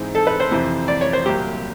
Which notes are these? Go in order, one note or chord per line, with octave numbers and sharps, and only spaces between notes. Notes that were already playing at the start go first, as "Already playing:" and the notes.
Already playing: G#2 E3 G#3 C4 D#4
A4
B4
C5
F2 C3 E3
D5
C#5
C5
C2 A#2 F#3 G4